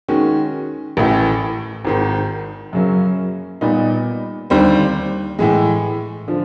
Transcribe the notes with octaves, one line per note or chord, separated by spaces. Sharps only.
D#3 G#3 C#4 F#4
A1 A2 E3
G#1 G#2 D#3
F#2 C#3 F#3 A#3 C#4
A#2 G3 B3 D#4
D#2 D3 G3 C4
A2 E3 G#3
D3 F3